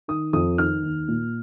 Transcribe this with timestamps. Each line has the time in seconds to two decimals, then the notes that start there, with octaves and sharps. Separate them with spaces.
0.08 D#3 D#6
0.33 F2 D#6
0.58 D#3 F6
0.83 D#2
1.08 A#2